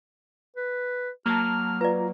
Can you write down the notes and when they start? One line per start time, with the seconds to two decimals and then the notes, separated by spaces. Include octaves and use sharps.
0.56 B4
1.26 F#3 A#3 A5 A#5 F6
1.81 F4 B4 D5 A#5